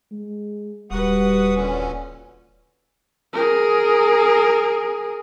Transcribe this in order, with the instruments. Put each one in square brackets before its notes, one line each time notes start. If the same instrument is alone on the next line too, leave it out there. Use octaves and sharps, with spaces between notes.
[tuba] G#3
[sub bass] D#1 [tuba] G3 [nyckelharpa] F#4 B4 [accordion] F#5 D#6
[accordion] A#2 D3 C#4
[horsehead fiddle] G#4 A#4